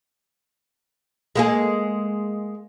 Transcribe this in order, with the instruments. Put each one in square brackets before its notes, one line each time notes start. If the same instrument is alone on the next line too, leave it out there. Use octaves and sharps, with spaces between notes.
[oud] G#3 A#3 G#4